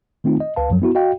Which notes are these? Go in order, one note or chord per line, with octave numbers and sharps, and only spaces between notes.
D#3 A3 C4 D#4 F4
D#5
C#2 B4 F5 A5
F#2 F3 F#3
B3 E4 F#4
F#4 D#5 F5 G5